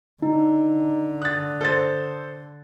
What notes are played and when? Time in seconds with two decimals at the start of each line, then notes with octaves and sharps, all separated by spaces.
0.22 D3 D#4
1.22 D#6 F#6 A6
1.61 A4 C5 A6